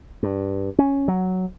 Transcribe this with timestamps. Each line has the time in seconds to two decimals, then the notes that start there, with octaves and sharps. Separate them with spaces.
0.23 G2
0.79 C#4
1.08 F#3